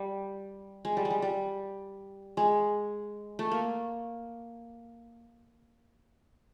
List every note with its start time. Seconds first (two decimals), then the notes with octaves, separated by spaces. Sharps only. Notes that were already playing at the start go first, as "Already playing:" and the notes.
Already playing: G3
0.85 G#3
0.97 G3
1.05 G#3
1.10 G3
1.22 G3
2.37 G#3
3.39 A3
3.51 A#3